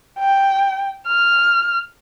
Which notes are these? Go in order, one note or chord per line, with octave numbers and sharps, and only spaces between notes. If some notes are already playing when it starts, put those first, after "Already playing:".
G5
F6